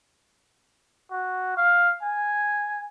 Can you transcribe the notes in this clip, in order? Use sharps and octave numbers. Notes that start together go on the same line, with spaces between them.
F#4
F5
G#5